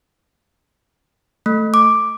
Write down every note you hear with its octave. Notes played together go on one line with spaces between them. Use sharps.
A3
D6